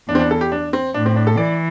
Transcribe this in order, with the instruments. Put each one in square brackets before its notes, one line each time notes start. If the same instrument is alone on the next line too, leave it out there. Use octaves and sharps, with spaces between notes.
[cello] E2 [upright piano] D4
[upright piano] C4
D4
A4
G4
D4
C4
[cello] A2 [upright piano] D4
[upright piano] C4
D4
A4
[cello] E3 [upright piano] D5